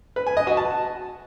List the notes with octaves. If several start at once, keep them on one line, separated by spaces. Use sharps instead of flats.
B4
G#5
D#5
F#4
A5